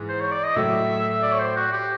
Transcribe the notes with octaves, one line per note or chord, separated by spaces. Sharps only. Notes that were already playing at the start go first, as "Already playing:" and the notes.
Already playing: G#2 E3 G#3
C5
C#5
D5
D#5
A2 F#3 A3 E5
D5
C#5
C5
F#4
G4